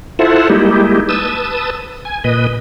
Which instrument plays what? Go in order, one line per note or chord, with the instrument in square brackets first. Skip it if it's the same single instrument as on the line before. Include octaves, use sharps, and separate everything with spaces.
[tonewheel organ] E4 F4 A4 C5 E5 F#5
G3 G#3 A#3 D#4 E4 G4
B4 A5 D#6 E6
G#5
A#2 B4 D#5